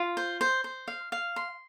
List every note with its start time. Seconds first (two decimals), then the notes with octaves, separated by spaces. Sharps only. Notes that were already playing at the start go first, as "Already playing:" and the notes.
Already playing: F4
0.17 C5
0.41 C5
0.64 C5
0.88 F5
1.12 F5
1.36 C6